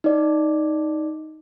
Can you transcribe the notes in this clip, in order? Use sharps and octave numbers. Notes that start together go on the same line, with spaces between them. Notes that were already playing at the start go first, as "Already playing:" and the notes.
D#4 D5